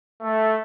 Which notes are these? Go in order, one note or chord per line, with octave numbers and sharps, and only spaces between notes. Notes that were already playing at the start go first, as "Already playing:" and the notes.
A3